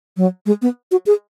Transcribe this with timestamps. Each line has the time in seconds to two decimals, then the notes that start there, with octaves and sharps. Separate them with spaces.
0.17 F#3
0.46 G#3
0.62 B3
0.91 F#4
1.06 G#4